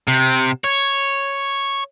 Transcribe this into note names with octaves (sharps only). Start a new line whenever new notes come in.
C3
C#5